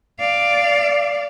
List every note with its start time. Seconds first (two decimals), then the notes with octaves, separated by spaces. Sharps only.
0.20 D5 F5